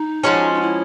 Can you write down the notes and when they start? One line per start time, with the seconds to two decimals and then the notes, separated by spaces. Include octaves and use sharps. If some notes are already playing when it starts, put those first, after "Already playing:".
Already playing: D#4
0.24 F3 G#3 C#4 F#4
0.54 D#4
0.61 E4